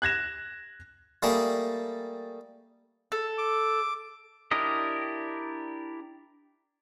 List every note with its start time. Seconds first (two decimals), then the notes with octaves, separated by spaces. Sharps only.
0.02 F#6 G#6 A#6 E7
1.23 G3 A3 A#3 G#4 A5
3.12 A4
3.38 D6
4.51 D4 E4 G4 A#4 D#5